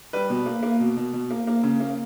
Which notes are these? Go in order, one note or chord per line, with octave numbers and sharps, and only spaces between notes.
G3 B4
B2
A#3
A#3
B2
B2
B2
A#3
A#3
C#3
A#3